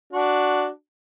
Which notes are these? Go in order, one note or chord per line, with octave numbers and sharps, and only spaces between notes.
D4 F#4